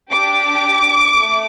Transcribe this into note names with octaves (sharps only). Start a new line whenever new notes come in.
D4 G4 D6
A3